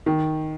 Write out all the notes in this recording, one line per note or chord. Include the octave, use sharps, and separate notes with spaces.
D#3